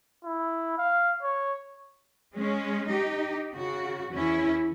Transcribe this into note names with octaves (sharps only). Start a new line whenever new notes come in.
E4
F5
C#5
G#3 C#4
D#4 G4
C#3 F#4
E2 E3 C#4 E4